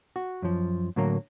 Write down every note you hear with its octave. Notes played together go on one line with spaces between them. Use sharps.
F#4
F#2 F3
A2 D3 F#3 A#3